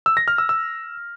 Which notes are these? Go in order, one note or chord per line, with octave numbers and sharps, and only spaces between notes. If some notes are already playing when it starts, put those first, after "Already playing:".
E6
A#6
F6
E6
E6